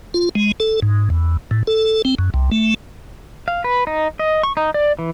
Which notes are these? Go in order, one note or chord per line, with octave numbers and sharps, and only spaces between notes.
F4
G#3
A4
G#2
E2
A2
A4
C4
F#2
C2
A3
F5
B4
D#4
D#5
C#6
D#4
D5
E3